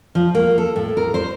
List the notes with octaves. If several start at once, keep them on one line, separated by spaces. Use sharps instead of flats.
F3
A#3
A4
A2
A#4
C5